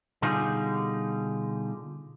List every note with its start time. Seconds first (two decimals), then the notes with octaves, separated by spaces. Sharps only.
0.22 B2 D3 G3 D#4 F4 G#4